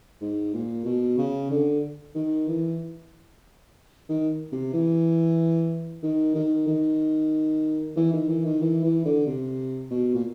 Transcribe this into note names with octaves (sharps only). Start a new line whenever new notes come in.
G#2
A#2
B2
C#3
D3
D#3
E3
D#3
C3
E3
D#3
D#3
D#3
E3
D#3
E3
D#3
E3
E3
D3
C3
B2
A#2